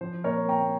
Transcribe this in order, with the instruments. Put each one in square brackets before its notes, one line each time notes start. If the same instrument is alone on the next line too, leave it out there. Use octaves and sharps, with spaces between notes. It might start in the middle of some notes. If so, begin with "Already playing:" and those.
[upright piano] F3 C5
A#2 A#4 C#5
A#2 G5 A#5